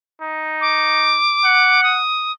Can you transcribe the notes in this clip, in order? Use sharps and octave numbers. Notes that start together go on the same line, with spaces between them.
D#4
D6
F#5
D#6